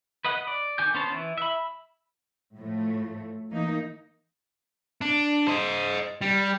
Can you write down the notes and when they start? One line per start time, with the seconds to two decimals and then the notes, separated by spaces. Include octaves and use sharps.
0.25 B4 D#5 F#5
0.47 D5
0.78 D#3 G#5 D6 G6
0.94 B3 C#4 C5 A5
1.12 E3
1.38 E5 B5
2.56 A2 F3 A3
3.50 E3 A#3 D#4
5.01 D4
5.48 C5 D#5
6.21 G3